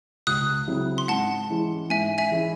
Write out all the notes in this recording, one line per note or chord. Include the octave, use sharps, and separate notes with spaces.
C#2 D#6 F#6
C#3 F#3 C4 E4
C6
G#2 F#5 A5
E3 G#3 C#4 E4
G#2 E5 G#5
E5 G#5
E3 G#3 C#4 E4